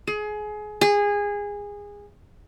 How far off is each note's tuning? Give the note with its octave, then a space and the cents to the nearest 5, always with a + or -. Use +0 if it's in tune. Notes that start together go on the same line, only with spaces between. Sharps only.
G#4 +25
G#4 -20